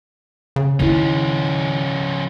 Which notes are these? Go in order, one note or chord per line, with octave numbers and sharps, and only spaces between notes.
C#3
D#3 F3 C#4 E4